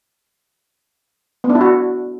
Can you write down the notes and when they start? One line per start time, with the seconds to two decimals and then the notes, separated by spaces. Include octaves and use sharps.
1.44 B3
1.50 D4
1.55 E4
1.61 F#4